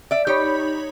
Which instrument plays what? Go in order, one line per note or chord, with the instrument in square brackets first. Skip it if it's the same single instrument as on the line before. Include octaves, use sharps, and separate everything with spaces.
[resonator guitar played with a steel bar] D5 E5
[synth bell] D#4 C#5 B5 [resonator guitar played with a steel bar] G4